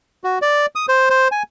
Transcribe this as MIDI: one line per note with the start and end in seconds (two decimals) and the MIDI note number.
0.24 0.39 66
0.42 0.66 74
0.75 0.86 87
0.89 1.09 72
1.10 1.28 72
1.32 1.43 80